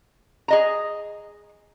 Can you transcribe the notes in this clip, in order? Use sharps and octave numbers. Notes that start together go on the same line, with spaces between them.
G#4 D#5 A#5